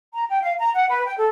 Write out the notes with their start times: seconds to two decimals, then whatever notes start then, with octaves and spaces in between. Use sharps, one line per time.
0.13 A#5
0.30 G5
0.41 F5
0.59 A#5
0.75 F#5
0.88 B4
1.05 G5
1.17 A4